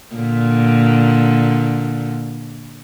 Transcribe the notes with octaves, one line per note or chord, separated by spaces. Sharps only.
A#2 D3